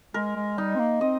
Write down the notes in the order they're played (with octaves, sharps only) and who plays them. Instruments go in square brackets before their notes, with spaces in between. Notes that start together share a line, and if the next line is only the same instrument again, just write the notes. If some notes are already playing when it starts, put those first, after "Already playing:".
[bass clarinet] G#3 [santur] A#4
[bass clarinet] G#3
[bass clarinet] G3 [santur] D#4
[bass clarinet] C4
A#3
[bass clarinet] C4 [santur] D#5